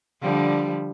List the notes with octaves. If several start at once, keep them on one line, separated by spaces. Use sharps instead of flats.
D3 F3 G3